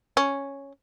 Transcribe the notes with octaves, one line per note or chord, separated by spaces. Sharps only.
C#4